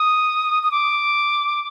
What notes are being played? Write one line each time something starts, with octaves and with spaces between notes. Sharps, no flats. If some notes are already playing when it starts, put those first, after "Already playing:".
Already playing: D#6
D#6
D6